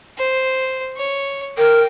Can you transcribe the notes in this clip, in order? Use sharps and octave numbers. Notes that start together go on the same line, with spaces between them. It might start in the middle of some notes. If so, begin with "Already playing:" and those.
C5
C#5
A#4 G5